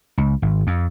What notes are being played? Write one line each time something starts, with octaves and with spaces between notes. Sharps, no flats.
C#2
G#1
F2